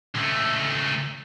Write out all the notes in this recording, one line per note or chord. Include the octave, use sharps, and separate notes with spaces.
C#2 A3